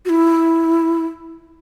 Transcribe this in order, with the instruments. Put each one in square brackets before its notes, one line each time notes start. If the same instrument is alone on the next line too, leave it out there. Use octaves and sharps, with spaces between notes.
[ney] F#4
E4